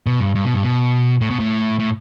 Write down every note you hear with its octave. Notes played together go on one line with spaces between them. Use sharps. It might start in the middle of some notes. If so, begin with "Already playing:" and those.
B2
G2
G2
B2
G2
B2
A2
B2
A2
A2